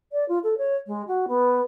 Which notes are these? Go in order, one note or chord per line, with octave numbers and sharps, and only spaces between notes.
D5
F4
A4
C#5
G#3
F#4
B3